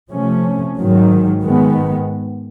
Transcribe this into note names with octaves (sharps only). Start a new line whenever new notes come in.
C3 F3 A3 C#4
G#2 D#3 F#3
G#2 D#3 G#3 B3